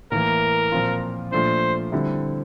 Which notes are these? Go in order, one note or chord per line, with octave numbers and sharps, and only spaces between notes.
A2 E3 A#3 A#4
A#2 F3 C4 F4
A#2 F3 A3 D4 F4 C5
D3 G3 C4 E4